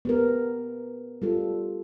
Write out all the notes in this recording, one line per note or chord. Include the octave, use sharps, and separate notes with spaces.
B3 G4 A#4
G3 F4 A4